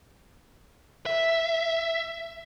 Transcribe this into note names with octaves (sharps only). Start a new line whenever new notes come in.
E5